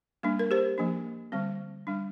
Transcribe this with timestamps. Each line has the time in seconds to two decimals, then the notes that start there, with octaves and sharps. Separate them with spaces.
0.23 G3 A#3 D4
0.39 A#4
0.51 G4 C5
0.78 F3 A#3 D4
1.32 D3 G3 C4
1.87 G3 D4